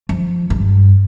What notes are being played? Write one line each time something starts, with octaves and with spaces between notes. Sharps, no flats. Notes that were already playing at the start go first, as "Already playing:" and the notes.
F3
G2